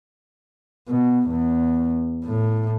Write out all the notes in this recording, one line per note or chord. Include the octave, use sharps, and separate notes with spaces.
B2
E2
A2